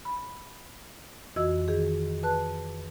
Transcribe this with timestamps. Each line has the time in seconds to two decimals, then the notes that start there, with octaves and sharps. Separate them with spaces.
0.05 B5
1.36 F2 E3 F#4 D#5 E6
1.68 D#3 G#4
2.23 B4 A5 F#6